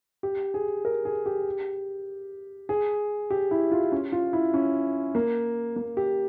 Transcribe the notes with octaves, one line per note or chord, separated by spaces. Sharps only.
G4
G#4
A#4
G#4
G4
G#4
G4
E4
F4
C#4
F4
E4
C#4
A#3
A#3
G4